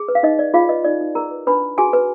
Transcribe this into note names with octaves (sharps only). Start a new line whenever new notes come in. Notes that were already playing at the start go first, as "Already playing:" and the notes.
Already playing: G#4
B4
F5
D#4 D#5
D#4 D5
F4 G#4 F5
B4 D#5
D#4 D5
D#4
G#4 A#4 A#5
B4
D4 B4 B5
D4
F#4 G#4 G#5
B4